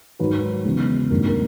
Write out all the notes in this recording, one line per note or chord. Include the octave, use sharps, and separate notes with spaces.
G#2 D#3 F#3 B4
E2 C#3 E3 G#3
A1 G2 D#3 F#3 B3 A#4
A#4